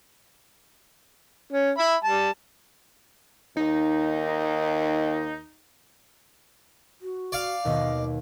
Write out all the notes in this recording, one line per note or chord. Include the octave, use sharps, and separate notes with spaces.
C#4
E5 B5
G3 A5
D#2 D#4
F#4
D5 F5
D#2 B2 D#5